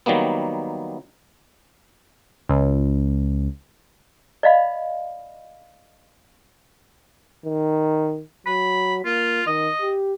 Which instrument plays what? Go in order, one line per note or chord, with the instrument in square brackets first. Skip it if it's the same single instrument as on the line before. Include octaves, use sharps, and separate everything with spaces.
[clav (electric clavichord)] D#3 F#3 G3 A#3 B3
[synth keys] C#2
[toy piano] D5 D#5 F5 B5
[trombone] D#3
[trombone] F#3 [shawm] B5
[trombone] A#3 [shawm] F4
[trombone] D#3 [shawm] D#5
[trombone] G4